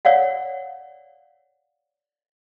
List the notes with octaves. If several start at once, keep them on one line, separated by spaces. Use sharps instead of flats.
C#5 D5 F5 F#5